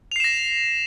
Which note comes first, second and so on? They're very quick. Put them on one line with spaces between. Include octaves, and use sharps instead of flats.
F7 C7 E7 A#6